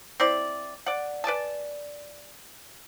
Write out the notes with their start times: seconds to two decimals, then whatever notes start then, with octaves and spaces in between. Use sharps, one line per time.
0.20 C4 E4 D5
0.86 D5 F#5
1.24 B4 D5 G#5 A5